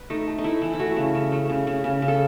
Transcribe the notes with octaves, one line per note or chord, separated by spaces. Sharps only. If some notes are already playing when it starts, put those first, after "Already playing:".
Already playing: B4
A3 D#4
A3
D#4
A3 E4
E3
E4
A3 F#4
C#3
C#3
A3
C#3
C#3
C#3
C#3
A4